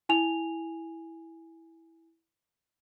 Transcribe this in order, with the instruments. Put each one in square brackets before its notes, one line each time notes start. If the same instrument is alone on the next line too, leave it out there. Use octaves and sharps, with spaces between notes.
[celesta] E4 G#5 F7